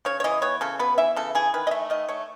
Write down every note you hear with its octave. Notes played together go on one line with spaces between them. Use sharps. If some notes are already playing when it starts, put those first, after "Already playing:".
C#3 C#5
C#5
E3 D#5
B3 C#5
C#3 A4
B3 B4
E3 E5
C#3 A4
E3 G#4
D#3 B4
D#5
A3 E5
D#3 D#5
A3 C#5